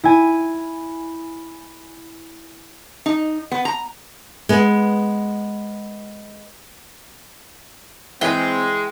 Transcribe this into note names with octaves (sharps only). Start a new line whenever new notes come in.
E4 G#5
D#4
B3
A#5
G#3 B3
E3 G#3 C4 E4 G#4 G5